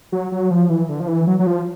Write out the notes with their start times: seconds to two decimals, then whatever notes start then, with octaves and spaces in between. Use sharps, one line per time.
0.12 F#3
0.32 F#3
0.51 F3
0.70 E3
0.89 D3
1.00 F3
1.08 E3
1.27 F#3
1.39 F#3
1.47 F3